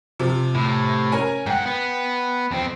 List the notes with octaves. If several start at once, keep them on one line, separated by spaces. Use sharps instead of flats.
C3 F3
A2
C#4 A#4 G#5
G#2 F#5 G5
B3
F2 C4